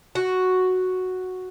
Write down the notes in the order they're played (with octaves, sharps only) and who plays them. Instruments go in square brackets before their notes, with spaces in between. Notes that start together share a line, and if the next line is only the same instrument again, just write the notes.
[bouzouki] F#4